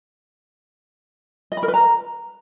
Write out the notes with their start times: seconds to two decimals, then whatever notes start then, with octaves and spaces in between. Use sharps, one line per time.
1.52 D#5
1.57 B5
1.63 A#4
1.68 B4
1.74 A#5